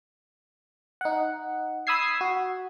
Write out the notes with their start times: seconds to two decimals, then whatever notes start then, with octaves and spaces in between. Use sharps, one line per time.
1.01 D#4 F#5
1.87 B5 D#6 E6 G#6 C7
2.21 F#4